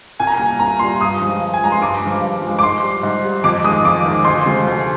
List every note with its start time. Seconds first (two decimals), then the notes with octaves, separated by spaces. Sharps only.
0.19 C2 G#5
0.27 A#5
0.36 G#5
0.39 A#2 G3
0.59 C2 A#5
0.79 A#2 G3 C6
1.01 G2 D#6
1.21 F3 G#3
1.41 G2
1.54 G#5
1.61 F3 G#3 A#5
1.72 C6
1.81 G2 D6
2.02 F3 G#3
2.22 G2
2.42 F3 G#3
2.59 D6
2.62 G#2 C6
2.83 G3
3.03 G#2
3.24 G3
3.44 F2 D6
3.64 G#3 D#6
3.68 D#3
3.85 F2 D6
4.05 D#3 G#3
4.25 D2 C6
4.46 C3 F3 G#3
4.67 D2